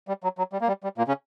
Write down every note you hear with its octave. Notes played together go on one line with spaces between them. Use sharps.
G3
F#3
F#3
G3
A#3
G3
G3
A#2 A#3
C#3 C#4